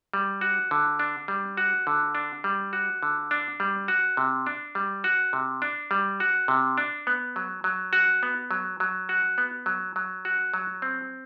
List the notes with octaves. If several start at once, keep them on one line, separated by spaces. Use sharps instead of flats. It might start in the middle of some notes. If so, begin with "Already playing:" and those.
G3
F#4
D3
D4
G3
F#4
D3
D4
G3
F#4
D3
D4
G3
F#4
C3
D4
G3
F#4
C3
D4
G3
F#4
C3
D4
B3
F#3
F#3
F#4
B3
F#3
F#3
F#4
B3
F#3
F#3
F#4
F#3
C4